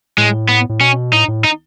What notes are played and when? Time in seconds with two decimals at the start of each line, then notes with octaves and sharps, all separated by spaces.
0.17 A2 G#3
0.49 B3
0.69 A2
0.81 B2 C#4
1.13 A2 D#4
1.28 A2
1.44 D#4